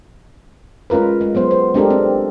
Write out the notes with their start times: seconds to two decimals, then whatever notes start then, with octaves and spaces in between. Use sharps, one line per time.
0.90 G#3 C#4 F4 A#4 B4
1.21 G#3
1.35 F#3 B3 C5
1.51 C5
1.74 G#3 C4 D4 G4 A4 A#4
1.90 C4